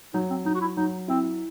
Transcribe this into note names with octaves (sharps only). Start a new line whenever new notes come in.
F#3 D#4
C4
F#3 D#4
F#4
E4
F#3 D#4
C4 E4